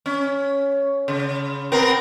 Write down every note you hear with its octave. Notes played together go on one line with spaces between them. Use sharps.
C#4
C#3
B3 C4 A#4